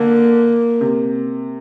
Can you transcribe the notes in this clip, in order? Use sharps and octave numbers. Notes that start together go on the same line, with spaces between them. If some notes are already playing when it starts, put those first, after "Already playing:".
Already playing: D3 A#3
C3